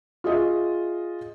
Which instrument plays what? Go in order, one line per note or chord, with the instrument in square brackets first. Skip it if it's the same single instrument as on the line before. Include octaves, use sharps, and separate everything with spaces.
[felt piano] F4 G#4 D#5 E5